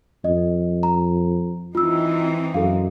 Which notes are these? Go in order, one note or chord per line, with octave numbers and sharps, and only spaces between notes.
F2 D#5
A#5
E3 C4 D#4 F4 E6
F#2 A4 F5